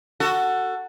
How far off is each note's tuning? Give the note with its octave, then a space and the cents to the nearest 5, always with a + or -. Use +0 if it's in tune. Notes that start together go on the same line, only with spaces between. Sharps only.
F#4 +0 A4 +20